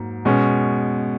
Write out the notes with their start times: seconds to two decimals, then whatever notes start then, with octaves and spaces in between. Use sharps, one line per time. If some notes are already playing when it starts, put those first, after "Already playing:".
Already playing: G#2 F#3 A#3
0.25 B2 G#3 C#4